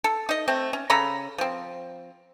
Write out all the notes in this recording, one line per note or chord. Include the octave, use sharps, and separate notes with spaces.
A4
D#4 D#5
A3 C4
C#4
C#3 A4 A#5 B5
F3 C4